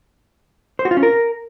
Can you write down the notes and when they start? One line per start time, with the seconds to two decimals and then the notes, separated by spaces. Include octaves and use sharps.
0.79 C5
0.85 F#4
0.91 F4
0.97 C#4
1.03 A#4